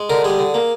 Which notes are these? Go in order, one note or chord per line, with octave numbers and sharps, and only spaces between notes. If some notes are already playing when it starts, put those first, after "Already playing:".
Already playing: G#3
D3 A#4
G3 G#4
D3
A#3